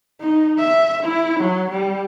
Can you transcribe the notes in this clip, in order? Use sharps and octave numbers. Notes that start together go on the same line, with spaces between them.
D#4
E5
E4
F#3
G3